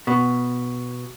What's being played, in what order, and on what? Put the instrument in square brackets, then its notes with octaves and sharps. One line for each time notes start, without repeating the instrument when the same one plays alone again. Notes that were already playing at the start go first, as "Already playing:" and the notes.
[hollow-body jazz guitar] B2